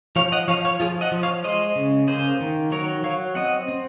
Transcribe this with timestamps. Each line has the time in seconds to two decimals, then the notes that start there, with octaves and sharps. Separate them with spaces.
0.16 F3 C#5 F5
0.32 D#5 F#5
0.48 F3 C#5 F5
0.65 C#5 F5
0.80 F3 F4 G#4
1.01 D#5 F#5
1.12 F3
1.23 C#5 F5
1.44 G#3 C5 D#5
1.76 C#3
2.08 A#3 G#4 C5
2.40 D#3
2.71 F#3 A#4 C#5
3.03 F#3 C#5 F5
3.35 C4 D#5 F#5
3.68 C4